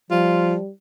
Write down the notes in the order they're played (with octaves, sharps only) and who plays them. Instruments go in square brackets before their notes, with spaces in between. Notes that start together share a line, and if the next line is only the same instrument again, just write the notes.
[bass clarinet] F3 [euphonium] G3 [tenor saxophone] F4